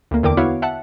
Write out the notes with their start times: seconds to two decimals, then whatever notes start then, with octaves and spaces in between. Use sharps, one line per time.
0.11 D2 A#3
0.23 E2 D3 A#4 G5 D6 D7
0.37 B3 E4 F#4 C#5 F5
0.62 E5 F#5 A5